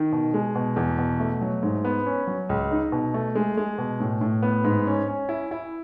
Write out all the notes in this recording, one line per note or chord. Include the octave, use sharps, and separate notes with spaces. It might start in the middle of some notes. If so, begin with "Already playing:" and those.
Already playing: D#3
B2
G#3
B2
E2
B2
A3
F#3
G#2
B3
C#4
F#3
C#2
D#4
B2
A3
G#3
G#3
B2
A2
A2
B3
G#2
C#4
C#4
E4
E4